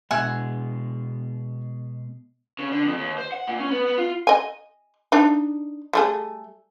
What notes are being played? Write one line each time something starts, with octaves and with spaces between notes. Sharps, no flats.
B2 G#3 E5 F#5 G#5
C#3
D3
F2
D#2
C5
F#5
A#2
C#4
B3
B3
F4
D#5 G#5
D4 D#4
G3 A3 G#4